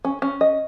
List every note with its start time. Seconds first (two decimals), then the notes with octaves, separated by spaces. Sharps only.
0.05 C#4
0.22 C#4
0.41 D#5